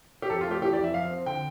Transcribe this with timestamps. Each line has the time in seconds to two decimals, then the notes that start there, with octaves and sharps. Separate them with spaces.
0.22 G4
0.30 F2 A4
0.41 F4
0.46 A3 G4
0.62 E3 G4
0.73 D5
0.78 F2
0.84 E5
0.94 F3 F5
1.10 C4
1.26 D3 G5